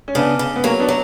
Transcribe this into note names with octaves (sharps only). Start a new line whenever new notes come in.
C#4
C#3 B3 D4
C#3
B3
F#3 A#3 C#4
B3 D4
F#3